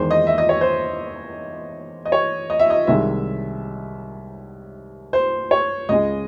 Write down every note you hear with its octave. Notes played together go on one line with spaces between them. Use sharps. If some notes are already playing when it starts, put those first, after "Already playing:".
Already playing: E2 D#3 G#3 C5
D#5
E5
D#5
C#5
C5
D#5
C#5
D#5
E5
D#5
C2 C3 D#3 G#3 E5
C5
C#5
C#2 C#3 G#3 D#5